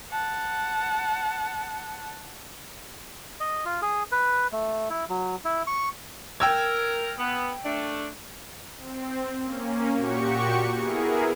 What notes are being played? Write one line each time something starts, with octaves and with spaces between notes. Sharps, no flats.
F#5 A5
D#5
F4
G#4
B4
A3
E4
F#3
E4
C#6
A#4 G5 E6 G#6
B3
A3 D4
C4
A#3 C#4
A#2 F#4 G4 C#6 C#7
B3 E4 G#4 A#4